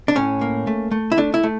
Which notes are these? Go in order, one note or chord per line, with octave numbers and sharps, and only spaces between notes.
D4
A2 C#4
A#3
A3
A3
E4
A3 D4
E4
A3